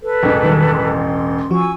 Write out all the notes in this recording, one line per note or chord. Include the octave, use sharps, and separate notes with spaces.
A4 B4
E1 A1
D#3 F#3 G3
C6
F3 F#4 G#5 C#6 E6